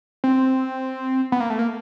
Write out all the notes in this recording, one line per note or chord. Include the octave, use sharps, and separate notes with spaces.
C4
B3
A#3
A3
A#3